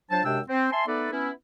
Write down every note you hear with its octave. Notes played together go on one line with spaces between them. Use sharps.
F3 F#3 D4 C5 A5
F#2 C3 G#3 D4 G5 E6
C4
E5 G#5 A5 C6
A3 B3 D#4 A4 B4 D5
B3 C#4 E4